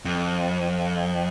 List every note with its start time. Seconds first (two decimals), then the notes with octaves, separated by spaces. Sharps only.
0.05 F2